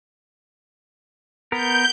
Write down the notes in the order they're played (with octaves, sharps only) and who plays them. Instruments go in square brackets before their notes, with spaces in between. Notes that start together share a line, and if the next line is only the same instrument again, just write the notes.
[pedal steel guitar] B3 A#4 [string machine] G6